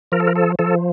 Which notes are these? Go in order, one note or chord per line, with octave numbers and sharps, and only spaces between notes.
F3 A#4
A4
A#4
A4
F3 A4